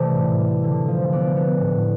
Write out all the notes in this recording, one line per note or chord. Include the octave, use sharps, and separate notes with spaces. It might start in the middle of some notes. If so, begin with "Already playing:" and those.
Already playing: C3 E3 A3 D5
A2
G3
D3
F3
B3 D5
B3
A2